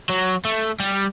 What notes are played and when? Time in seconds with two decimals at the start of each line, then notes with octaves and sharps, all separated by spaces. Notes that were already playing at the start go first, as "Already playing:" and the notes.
0.09 F#3
0.45 A3
0.80 G3